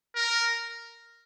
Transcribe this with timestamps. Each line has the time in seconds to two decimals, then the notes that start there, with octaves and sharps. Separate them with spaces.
0.16 A#4